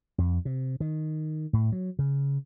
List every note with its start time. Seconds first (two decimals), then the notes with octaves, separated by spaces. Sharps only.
0.18 F2
0.45 C3
0.80 D#3
1.53 A2
1.72 F#3
1.99 C#3